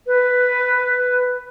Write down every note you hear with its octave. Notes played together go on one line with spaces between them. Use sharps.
B4